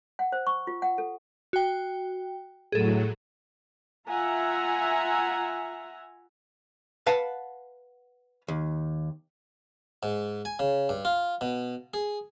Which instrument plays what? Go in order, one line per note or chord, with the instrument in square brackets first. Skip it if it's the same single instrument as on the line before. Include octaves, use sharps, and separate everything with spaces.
[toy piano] F#5
C5
C#6
F4
F#5
A4
[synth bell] F#4 G5
[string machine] A2 F#3 [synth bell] G#4 A4
[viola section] F4 E5 F#5 G#5 A#5
[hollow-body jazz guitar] B4 F5 F#5 A5
D#2
[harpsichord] G#2
G#5
C#3
G2
F4
B2
G#4